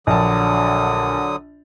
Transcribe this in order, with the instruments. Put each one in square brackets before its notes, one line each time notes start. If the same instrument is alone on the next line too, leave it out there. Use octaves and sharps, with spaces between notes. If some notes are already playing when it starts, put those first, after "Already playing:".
[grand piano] A#1 A5 [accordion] D3 F#3 D#6